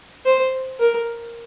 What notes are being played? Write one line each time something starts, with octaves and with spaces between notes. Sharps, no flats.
C5
A#4